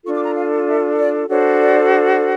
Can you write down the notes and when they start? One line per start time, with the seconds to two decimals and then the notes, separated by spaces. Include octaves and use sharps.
0.05 D4 F4 A4 C#6
0.14 D6
0.25 A#5
0.35 F5
0.67 E5
0.98 D5
1.29 D4 F#4 A4 C5 C#5
1.61 D5